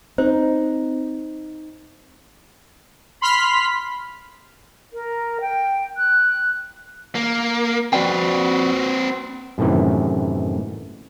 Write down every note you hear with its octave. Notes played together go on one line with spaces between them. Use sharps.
C4 D#4 C5
B5 C6 F6 B6
A#4
G5
F#6
A#3
F2 C4 F#4 B4 D5 G5
F#2 A2 C3 D#3 E3